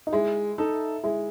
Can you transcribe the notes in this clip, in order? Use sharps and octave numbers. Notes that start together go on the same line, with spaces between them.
D#4
G#3 E4
D#4 A4
G#3 E4